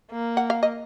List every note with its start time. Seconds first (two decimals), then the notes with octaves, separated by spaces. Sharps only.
0.12 A#3
0.37 F#5
0.50 F5
0.63 D#5